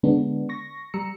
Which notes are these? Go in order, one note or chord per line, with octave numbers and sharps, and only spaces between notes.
D3 G#3 B3 D4
C#6 A#6
G3 A#5 E6 C#7